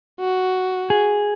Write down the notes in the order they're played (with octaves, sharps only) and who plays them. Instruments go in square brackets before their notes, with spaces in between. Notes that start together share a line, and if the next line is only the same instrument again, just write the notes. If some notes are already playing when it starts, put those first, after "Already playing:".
[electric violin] F#4
[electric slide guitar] G#4